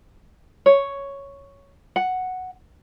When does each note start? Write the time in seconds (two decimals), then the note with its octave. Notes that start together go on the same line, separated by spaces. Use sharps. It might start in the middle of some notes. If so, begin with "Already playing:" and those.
0.66 C#5
1.96 F#5